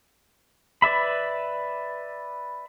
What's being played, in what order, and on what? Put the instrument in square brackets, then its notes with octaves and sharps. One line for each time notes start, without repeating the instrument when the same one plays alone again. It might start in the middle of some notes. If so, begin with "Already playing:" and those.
[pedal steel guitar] B4 D5 E5 B5